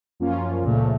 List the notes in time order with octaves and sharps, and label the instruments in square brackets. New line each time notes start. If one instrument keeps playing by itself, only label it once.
[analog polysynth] F#2 F3 A#3 C#4 F4
[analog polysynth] C#2 C#3 F3 A3 [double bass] A#2